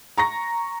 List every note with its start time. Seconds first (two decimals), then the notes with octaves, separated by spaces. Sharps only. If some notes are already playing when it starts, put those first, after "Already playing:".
0.18 A#5 C#6 A#6